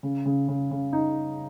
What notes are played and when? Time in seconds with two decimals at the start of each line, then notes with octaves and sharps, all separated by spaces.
0.03 C#3
0.25 C#3
0.48 C#3
0.71 C#3
0.93 D#4